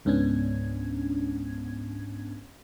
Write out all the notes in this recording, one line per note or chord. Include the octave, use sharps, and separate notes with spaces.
C#2 G#2 B3 C#4 D4 G#6